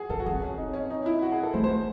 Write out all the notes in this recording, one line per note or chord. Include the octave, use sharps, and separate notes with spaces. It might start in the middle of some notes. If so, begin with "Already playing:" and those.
Already playing: F#4 G#4
C#4 A4
F#4
C4 G#4
C#4
D#4
C#4
D#4
E4
F#4
G#4
A4
A3 C5
C5